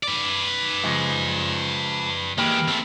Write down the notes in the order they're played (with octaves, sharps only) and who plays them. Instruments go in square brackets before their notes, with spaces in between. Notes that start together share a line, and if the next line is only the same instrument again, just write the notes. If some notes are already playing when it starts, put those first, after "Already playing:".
[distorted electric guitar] B4 D5
[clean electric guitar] C#3 F3 G#3
[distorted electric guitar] E3 G#3 [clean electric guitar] A#3 G4 B4
[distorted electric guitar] A3 C4